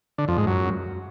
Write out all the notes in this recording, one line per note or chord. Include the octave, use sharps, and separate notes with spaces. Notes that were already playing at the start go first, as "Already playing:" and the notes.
D3
F2
G#2
F#2